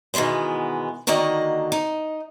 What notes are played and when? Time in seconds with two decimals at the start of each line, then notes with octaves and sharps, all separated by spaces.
0.14 B2 D#3 E3 G#3 B3
1.07 D3 D#3 A#3 F#4 D#5
1.72 D#4